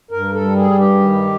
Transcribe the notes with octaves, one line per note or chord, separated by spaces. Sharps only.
G2 A#4
A4
G3
G#4
G2
G4
D#3